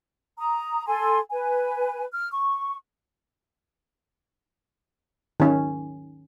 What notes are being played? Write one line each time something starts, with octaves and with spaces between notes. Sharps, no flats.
A#5 D#6
A4 G#5 C6
B4 G#5
F6
C#6
D#3 C#4